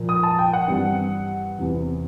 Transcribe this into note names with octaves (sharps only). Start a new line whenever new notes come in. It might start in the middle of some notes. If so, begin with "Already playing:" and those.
Already playing: A#2 F3 A#3
D#6
A5
G5
F#5
G2 E3 G3 C4
E2 C3 E3